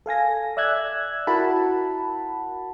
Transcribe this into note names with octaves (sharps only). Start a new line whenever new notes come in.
A4 F5 G#5 A#6
D5 E5 E6 F#6 G#6
E4 F#4 A#4 F#5 A5 B5